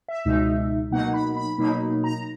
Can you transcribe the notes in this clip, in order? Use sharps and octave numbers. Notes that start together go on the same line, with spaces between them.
E5
C#2 B2 G#3 D#4
B2 F#3 A#3 D#4 F#5
B5
B5
B2 F#3 A#3 D#4 B5
A#5